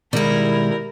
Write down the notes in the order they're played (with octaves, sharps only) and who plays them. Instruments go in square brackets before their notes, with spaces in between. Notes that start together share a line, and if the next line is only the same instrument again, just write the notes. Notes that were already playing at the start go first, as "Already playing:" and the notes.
[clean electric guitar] B2 D#3 G#3 [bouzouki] G3 E4 [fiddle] A#4